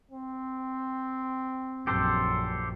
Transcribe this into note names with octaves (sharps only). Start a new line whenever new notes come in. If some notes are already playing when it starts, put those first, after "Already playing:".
C4
A#1 F#2 G4 A4 C5